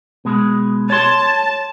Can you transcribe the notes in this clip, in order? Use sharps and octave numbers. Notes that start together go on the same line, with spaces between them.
B2 G#3
C#5 A5 C6